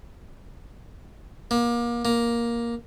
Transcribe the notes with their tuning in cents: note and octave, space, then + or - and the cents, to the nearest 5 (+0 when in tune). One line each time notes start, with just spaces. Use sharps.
A#3 +30
A#3 +10